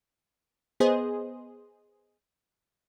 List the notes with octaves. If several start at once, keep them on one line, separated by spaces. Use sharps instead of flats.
B3 G#4 C5 D#5